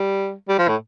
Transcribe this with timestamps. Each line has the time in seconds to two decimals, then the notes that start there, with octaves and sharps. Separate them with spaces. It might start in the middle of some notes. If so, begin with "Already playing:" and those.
Already playing: G3
0.48 G3
0.58 F3
0.68 A2